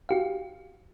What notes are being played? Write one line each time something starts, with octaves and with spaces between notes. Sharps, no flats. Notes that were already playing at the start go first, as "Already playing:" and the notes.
F#4 G4 F5